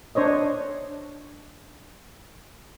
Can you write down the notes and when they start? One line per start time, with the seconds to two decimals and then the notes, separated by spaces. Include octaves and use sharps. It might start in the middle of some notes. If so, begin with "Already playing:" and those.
0.15 D4 C5 C#5 D#5